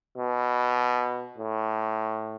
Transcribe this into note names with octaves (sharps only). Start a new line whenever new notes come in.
B2
A2